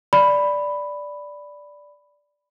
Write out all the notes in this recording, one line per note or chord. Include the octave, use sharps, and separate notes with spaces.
D5 B5